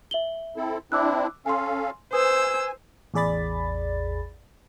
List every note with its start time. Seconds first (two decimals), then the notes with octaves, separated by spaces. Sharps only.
0.11 E5 F#7 G7
0.57 C4 E4 A4
0.92 C4 D4 E4 D6 E6 F#6
1.46 C#4 A4 F5 G#5 C6
2.13 B4 C5 G#5 D#6 E6
3.14 A1 E2 G#4 D5 B5 A6